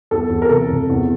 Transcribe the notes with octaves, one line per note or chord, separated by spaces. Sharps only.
E2 A4
E2
A#4
C3 A4
F1
E2